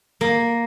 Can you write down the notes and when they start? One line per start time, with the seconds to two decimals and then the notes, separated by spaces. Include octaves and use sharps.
0.21 A#3